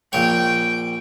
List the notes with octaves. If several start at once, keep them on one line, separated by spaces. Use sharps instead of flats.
A#1 C#5 G5